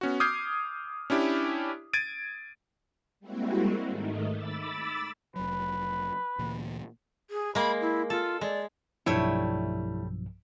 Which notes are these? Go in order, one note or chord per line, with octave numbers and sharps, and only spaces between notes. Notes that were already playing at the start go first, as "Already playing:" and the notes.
B3 C#4 F#4
D6 D#6 F6 G6 G#6 C7
C#4 D4 E4 G4
G#6 A6 D7 D#7
G3 G#3 A#3 C4 E4 F#4
G#2 D#3 A3 D#4
B5 D6 E6 A6
F1 F#3 B4
D2 A#2 E3
G#4
G#3 A#3 B5
E4
F4 A4
G#3 D5
B1 G2 F3 G3 A3 E4 C#5